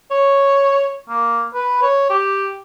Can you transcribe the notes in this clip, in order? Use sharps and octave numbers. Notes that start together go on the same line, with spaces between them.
C#5
A#3
B4
C#5
G4